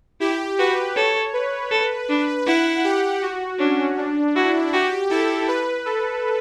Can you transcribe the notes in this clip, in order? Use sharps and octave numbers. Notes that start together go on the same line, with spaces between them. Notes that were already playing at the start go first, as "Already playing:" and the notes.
E4 G4
F#4 B4
A4 C#5
B4
A4
D4
E4 F#5
G4
F#4
C#4 D4
D4
E4 F#4
F#4 G4
E4 A4
B4
A4